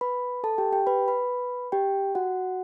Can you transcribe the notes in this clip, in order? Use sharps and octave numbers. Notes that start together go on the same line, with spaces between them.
B4 B5
A4 A5
G4 G5
G4 G5
B4 B5
B4 B5
G4 G5
F#4 F#5